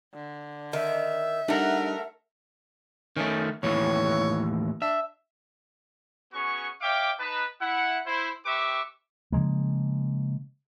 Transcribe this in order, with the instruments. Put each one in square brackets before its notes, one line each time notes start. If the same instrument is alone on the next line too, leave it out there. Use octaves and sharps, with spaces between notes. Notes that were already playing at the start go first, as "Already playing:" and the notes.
[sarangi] D3
[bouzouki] D#3 [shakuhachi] E5
[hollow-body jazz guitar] G3 D4 D#4 [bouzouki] A3 F#5 [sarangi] A#4
[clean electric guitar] D#3 A3 [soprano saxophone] C#4
[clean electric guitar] D#2 A2 E3 [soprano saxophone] C#5
[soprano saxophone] D4 [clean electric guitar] E5
[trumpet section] B3 C#4 F#4 G#4 C#6
C#5 E5 F5 G5 D6
D#4 B4 A5
E4 F#5
E4 C5
C4 G4 B4 E5 C#6 D6
[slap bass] C#3 F3 G#3 A#3